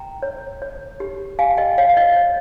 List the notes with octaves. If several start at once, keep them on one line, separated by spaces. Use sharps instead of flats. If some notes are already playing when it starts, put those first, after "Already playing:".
Already playing: G5 A#5
C#5
C#5
G4
G4 F5 G#5
D#5 G5
C#5 F5
F5
D#5
C#5